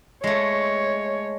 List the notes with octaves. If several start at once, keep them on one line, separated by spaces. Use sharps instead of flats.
G#3 A3 C#5